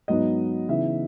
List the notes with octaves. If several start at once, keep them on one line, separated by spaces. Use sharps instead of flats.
G#2 F#3 B3 D#4 D#5
C#3 E3 B3 D#4 E5